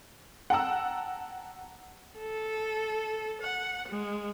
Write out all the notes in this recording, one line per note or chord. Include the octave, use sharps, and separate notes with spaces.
F#5 G5 A5 A#5 E6
A4
F#5
G#3